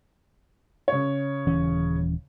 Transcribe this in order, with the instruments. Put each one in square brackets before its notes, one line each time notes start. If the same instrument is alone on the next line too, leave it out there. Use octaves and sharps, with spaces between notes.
[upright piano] C#3 C#5
[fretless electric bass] D#1 E3 C#4